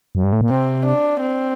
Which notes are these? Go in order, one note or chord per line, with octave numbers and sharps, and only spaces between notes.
F#2
G2
A2
A#2
C3 C4
D4
C4